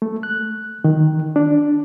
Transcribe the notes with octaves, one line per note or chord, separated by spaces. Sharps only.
A3
F#6
D#3
D4